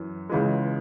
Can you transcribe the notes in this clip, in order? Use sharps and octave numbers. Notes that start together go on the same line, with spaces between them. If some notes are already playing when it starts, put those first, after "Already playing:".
Already playing: F#2 E3
C#2 C#3 E3 G#3